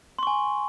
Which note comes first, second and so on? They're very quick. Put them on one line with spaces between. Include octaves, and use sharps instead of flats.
C6 C#6 G#5